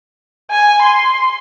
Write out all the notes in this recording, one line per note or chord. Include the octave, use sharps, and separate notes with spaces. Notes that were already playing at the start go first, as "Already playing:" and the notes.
G#5
C6